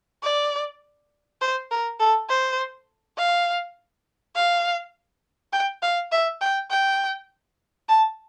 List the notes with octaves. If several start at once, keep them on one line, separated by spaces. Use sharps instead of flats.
D5
C5
A#4
A4
C5
F5
F5
G5
F5
E5
G5
G5
A5